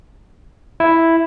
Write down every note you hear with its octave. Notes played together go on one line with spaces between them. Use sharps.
E4